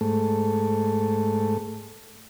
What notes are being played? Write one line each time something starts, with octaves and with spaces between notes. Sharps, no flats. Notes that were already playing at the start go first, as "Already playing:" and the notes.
G#2 A3